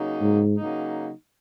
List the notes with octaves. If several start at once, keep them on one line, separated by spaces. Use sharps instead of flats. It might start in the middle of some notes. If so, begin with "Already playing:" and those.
Already playing: C#3 F#3 A#3 D#4
G#2
C#3 F#3 A#3 D#4